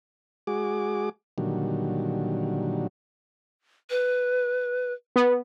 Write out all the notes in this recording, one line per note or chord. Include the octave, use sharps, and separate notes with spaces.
G#3 F#4 G#4 D6
A#2 D3 D#3 F#3 G3
B4
B3